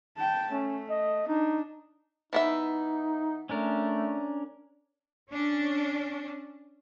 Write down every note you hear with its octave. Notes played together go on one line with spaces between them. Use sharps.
G5 A5
A3 C#4
D#5
D4 D#4
E3 B3 D#4 E5
A3 C#4 D4 A#4
C#4 D4